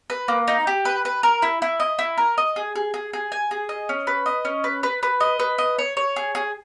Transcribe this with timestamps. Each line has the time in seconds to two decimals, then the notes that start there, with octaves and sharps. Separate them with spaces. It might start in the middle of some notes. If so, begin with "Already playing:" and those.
0.10 B4
0.28 A#3
0.48 D#4
0.67 G4
0.85 B4
1.05 B4
1.23 A#4
1.42 E4
1.62 E4
1.80 D#5
1.99 E4
2.18 A#4
2.38 D#5
2.56 G#4
2.76 G#4
2.94 G#4
3.13 G#4
3.32 G#5
3.51 G#4
3.69 D#5
3.89 C#4
4.07 B4
4.26 D#5
4.45 C#4
4.64 B4
4.83 B4
5.03 B4
5.20 D#5
5.39 B4
5.58 D#5
5.78 C#5
5.97 C#5
6.16 G#4
6.35 G#4